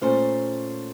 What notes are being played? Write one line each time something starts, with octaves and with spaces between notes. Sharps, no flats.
A#2 A3 C#4 C5